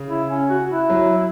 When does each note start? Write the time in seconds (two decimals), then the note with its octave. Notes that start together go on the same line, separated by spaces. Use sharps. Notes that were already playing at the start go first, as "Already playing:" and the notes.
Already playing: C#3
0.09 E4
0.30 C#4
0.49 F#4
0.69 E4
0.90 F#3